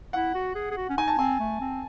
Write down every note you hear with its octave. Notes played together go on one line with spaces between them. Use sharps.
E4 F#5
F#4
G#4
G#4
F#4
C#4
D#4 G#5
A5
C4 G#5
A3
C4